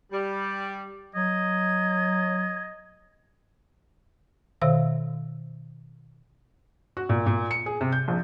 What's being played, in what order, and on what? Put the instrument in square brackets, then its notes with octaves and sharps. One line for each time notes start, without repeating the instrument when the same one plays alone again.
[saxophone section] G3
[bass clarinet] F#3 [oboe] D#5 [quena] G#6
[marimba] B2 D#3 C5 E5 F5 E6
[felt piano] F#4
A#2
A#2
C#7
G#4
C3
G6
A#1